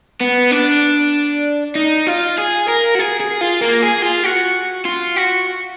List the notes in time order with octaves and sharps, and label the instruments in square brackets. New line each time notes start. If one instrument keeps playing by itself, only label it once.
[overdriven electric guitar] B3
D4
D#4
F4
G#4
A#4
F#4
G#4
G#4
F4
A#3
G#4
F4
F#4
F4
F#4